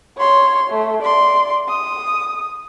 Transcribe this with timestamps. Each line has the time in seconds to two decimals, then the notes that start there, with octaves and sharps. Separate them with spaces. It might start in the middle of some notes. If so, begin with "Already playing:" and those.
0.18 C#5 C6
0.70 A3
1.02 D5 C6
1.68 D#6